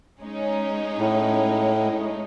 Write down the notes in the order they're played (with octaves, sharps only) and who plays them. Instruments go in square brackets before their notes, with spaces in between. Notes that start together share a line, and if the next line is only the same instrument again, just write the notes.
[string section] G#3 C#4 D#4
[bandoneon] A2